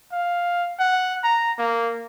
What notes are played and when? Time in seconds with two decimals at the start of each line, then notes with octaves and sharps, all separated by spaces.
0.12 F5
0.79 F#5
1.24 A#5
1.58 A#3